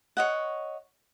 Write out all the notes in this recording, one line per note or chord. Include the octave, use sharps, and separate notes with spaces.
C#5 D#5 F#5